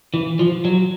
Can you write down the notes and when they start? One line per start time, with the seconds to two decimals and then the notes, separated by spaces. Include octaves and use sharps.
0.14 E3
0.39 F3
0.65 F#3